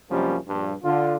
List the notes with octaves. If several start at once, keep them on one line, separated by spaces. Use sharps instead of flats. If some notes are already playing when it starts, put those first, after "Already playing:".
F#2 C3 F3 G3 A#3 C#4
A#1 G2
D3 F4